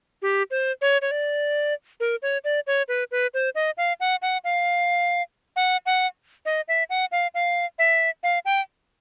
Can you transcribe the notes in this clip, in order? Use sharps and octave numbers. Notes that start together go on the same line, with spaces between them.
G4
C5
C#5
C#5
D5
A#4
C#5
D5
C#5
B4
B4
C5
D#5
F5
F#5
F#5
F5
F#5
F#5
D#5
E5
F#5
F5
F5
E5
F5
G5